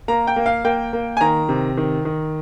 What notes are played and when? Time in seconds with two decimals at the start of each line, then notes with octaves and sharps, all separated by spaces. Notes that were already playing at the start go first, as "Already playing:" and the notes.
0.08 A#3 A#5
0.27 G5
0.36 A#3
0.46 F5
0.65 A#3 G5
0.93 A#3
1.17 G#5
1.21 D#3 A#5
1.49 C3
1.77 D#3
2.05 D#3